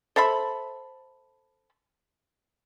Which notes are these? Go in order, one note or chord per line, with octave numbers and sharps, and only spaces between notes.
A4 C5 E5 B5